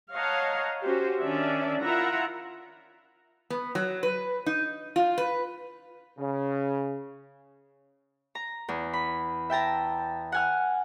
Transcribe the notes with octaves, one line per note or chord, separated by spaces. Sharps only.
C#5 D#5 F5 F#5 A5 A#5
C#4 F#4 G4 C5
D#3 C#4 D4 D5 E5
E4 F4 A#4 E5 F#5 A#5
B3
F#3
B4
D#4
F4
B4
C#3
A#5
E2
B5
E5 G5 A5 A#5
F#5 G#5 F6